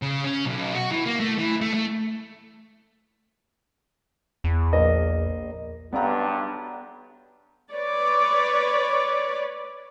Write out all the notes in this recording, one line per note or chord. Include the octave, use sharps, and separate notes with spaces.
C#3
C#4
B1
F#4
E3
A#3
A3
E3
A3
A3
E2
A#1 A#3 D#5
B1 G2 B3 D5 A#5
B4 C#5 D5